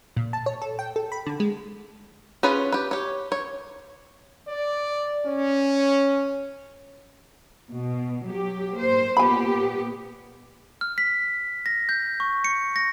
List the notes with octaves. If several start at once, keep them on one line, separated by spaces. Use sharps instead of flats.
A#2
A5
C#5
A4
G5
A4
B5
D3
G#3
C#4 F4 G#4 B4
G4 B4
G4 C#5
C#5
D5
C#4
B2
F#3 G4
A#3 C5
A#2 B3 G4 G#5 B5
F6
B6
A#6
G6
C#6
C#7
A#6